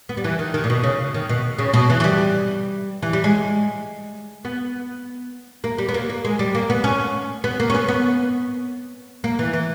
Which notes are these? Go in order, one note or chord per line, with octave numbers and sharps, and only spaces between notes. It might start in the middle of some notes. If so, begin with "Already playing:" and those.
B3
G3
E3
D#3
D#3
A#2
B2
C#3
D#3
B2
C#3
B2
E3
E3
G3
E3
G3
G#3
B3
A#3
G3
B3
A#3
A#3
G#3
G3
A#3
B3
C#4
B3
A#3
C#4
B3
B3
A#3
E3
E3